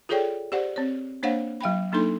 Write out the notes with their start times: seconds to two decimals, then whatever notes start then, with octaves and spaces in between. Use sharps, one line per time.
0.09 F4 G#4 A4 C#5 D5 G5
0.52 G4 C5 D5 F#5
0.76 C4 C#5
1.23 A#3 D4 C5 C#5 F5 F#5
1.61 F#3 F5 G5 B5
1.92 F#3 A#3 D4 D#4 A4 C6